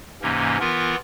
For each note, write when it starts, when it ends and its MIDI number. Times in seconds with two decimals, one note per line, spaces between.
0.22 0.57 44
0.22 0.57 48
0.22 0.57 52
0.22 0.57 58
0.22 0.57 61
0.60 0.96 52
0.60 0.96 59
0.60 0.96 65
0.60 0.96 70